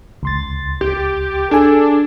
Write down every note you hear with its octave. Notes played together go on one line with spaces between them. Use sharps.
C#2 C6 A6
G4
D4 G#4 A4 G#5